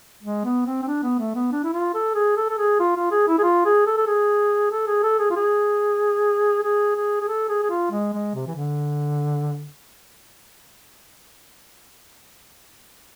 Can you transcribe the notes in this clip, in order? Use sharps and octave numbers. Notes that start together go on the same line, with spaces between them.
G#3
B3
C4
C4
D4
B3
A3
B3
D4
E4
F4
A4
G#4
A4
A4
G#4
F4
F4
G#4
E4
G#4
F4
G#4
A4
A4
G#4
A4
G#4
A4
G#4
F4
G#4
G#4
G#4
G#4
A4
G#4
G#4
F4
G#3
G#3
C3
E3
D3